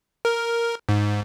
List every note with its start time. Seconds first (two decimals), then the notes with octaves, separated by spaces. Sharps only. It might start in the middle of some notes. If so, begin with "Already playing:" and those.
0.25 A#4
0.89 G#2